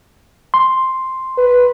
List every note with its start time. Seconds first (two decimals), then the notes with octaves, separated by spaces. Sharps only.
0.54 C6
1.38 B4